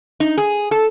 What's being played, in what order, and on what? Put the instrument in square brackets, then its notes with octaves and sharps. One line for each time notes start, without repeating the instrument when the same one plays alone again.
[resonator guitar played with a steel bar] D#4
G#4
A4